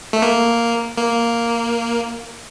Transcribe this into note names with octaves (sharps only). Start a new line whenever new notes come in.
A3
A#3
A#3